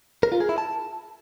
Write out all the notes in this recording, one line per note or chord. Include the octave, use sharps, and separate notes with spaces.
A#4
F4
G#4
E4
A5